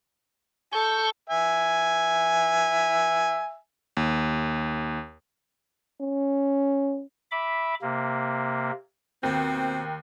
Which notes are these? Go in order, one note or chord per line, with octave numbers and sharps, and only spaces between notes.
A4 C#6 G6
E5 G#5
D#2
C#4
E5 B5 D6
C3 A#3
D#2 B2 C4